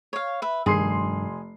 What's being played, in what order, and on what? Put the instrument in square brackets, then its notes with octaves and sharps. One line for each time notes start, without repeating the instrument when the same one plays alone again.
[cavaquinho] C#5 F5
B4 E5
[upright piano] F1 C6 C7 [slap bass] G2 D#3 [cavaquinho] G#4